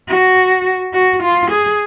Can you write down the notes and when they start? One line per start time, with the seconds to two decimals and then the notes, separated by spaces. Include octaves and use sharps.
0.08 F#4
0.94 F#4
1.23 F4
1.51 G#4